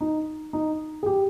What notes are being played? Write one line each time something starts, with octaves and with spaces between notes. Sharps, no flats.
D#4
D#4
G#4
G4